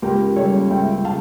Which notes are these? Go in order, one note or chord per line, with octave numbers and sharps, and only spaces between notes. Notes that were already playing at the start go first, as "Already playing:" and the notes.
C#2 G4 A#4
C#3 G3 A#3 A4 C#5
C#2 E5 G5
C#3 F5 A5